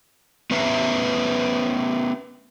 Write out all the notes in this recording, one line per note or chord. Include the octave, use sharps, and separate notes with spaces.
B3 C#4 B4 E5 A#5